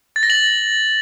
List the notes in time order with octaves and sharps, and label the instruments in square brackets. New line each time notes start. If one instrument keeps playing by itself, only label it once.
[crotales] A6
A#6
F#7